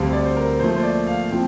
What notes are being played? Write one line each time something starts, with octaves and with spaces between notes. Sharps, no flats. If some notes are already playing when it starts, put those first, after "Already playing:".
Already playing: D2 D3 G3 C4 F5
D5
C5
A#4
A#2 F3 A3 C5
C5
D5
F5
A#2 F3 C4 G5